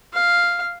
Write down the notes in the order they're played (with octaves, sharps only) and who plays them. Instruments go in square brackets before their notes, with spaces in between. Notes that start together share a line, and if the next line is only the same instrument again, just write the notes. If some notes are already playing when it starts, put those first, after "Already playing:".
[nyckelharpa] F5